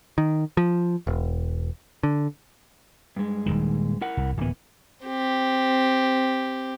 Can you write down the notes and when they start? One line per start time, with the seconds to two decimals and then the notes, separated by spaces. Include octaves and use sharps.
0.18 D#3
0.57 F3
1.07 E1
2.03 D3
3.16 G2 G#3
3.46 D#1 D#2 D#3
4.01 E4 A#4 F#5
4.17 C2
4.38 D1 A#2 E3 B3
5.05 C4 G4